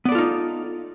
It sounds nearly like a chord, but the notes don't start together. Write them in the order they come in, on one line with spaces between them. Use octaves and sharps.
B3 D5 A4 F4 D#4